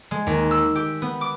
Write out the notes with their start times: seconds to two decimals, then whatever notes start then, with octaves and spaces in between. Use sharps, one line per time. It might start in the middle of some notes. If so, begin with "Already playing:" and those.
0.11 G#3
0.27 D#2
0.51 E6
0.75 G4
1.02 B3
1.21 D6